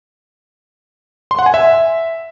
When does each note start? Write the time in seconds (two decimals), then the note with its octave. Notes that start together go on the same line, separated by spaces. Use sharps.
1.31 C6
1.39 F#5
1.46 G#5
1.54 E5